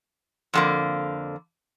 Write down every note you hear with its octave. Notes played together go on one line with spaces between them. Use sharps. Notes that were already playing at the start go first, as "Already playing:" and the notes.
F2 D3 A#3